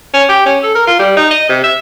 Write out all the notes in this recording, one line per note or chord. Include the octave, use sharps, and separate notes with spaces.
C#4
G4
C#4
A4
A#4
F4
G3
D#4
D#5
C3
E5